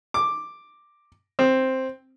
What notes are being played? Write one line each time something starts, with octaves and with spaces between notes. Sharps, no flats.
D6
C4